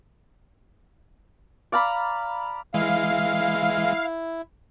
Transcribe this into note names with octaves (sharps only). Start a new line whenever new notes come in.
D5 F5 A#5 B5
E3 G#3 E4 F5